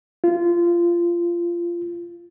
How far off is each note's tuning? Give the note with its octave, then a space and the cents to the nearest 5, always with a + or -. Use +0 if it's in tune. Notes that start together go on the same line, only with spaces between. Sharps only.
F4 -20